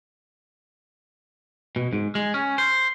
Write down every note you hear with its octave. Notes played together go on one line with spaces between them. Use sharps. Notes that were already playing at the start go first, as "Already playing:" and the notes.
B2
G#2
G#3
C#4
C5